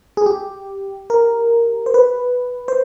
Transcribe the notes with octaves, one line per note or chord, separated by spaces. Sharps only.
G#4
G4
A#4
C5
B4
C5